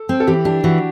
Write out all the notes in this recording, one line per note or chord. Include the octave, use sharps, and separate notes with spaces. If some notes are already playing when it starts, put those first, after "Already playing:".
Already playing: A4
C4
A4
E3 G4
D4 G4
E3 F#4